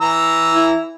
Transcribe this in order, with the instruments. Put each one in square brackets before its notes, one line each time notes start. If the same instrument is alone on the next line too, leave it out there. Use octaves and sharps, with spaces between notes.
[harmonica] E3 A#5 E6
[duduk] E4